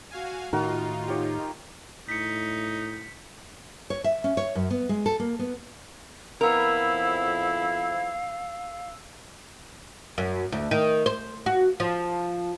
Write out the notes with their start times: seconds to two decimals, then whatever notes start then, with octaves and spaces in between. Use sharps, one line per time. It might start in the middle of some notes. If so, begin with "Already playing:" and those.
0.11 F#4 F5 G#5
0.53 A2 D#3 D#4 F4 F#4 A#4
1.08 G4 C#5
2.09 A2 D#4 B6 C#7
3.90 C#5
4.04 E5
4.24 C#4
4.37 C#5
4.55 F#2
4.71 B3
4.89 G#3
5.06 A4
5.20 A#3
5.39 B3
6.41 F2 B3 E4 A#4 F5 E6 F7
10.18 F#2
10.52 D2
10.71 D#3
11.06 C5
11.46 F#4
11.80 F3